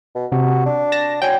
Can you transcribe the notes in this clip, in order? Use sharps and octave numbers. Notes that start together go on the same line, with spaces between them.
B2
C3 F#4
D4
A5 A#6
F#3 G5 G#5